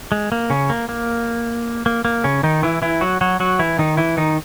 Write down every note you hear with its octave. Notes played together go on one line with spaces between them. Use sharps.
G#3
A#3
C#3 C#4
A#3
A#3
A#3
A#3
C#3 C#4
D#3 D#4
E3 E4
E3 E4
F#3 F#4
F#3 F#4
F#3 F#4
E3 E4
D#3 D#4
E3 E4
D#3 D#4